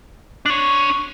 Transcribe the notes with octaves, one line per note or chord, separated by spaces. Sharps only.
D4 C#5